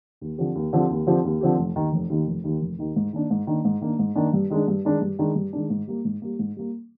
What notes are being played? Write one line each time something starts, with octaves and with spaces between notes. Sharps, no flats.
D#2
D3 F3 C4 G4
D#2
D3 F3 C4 G4
D#2
D3 F3 C4 G4
D#2
D3 F3 C4 G4
F1
D#2 D#3
F1
D#2 D#3
F1
D#2 D#3
F1
D#2 D#3
G#2
D#3 A#3 D4
G#2
D#3 A#3 D4
G#2
D#3 A#3 D4
G#2
D#3 A#3 D4
G2
D#3 G#3 D4
G2
D#3 G#3 D4
G2
D#3 G#3 D4
G2
D#3 G#3 D4
G#2
G3 A#3
G#2
G3 A#3
G#2
G3 A#3